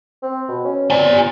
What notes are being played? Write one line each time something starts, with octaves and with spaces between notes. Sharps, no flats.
C4
B2
C#4
C4 D5 G#5
G2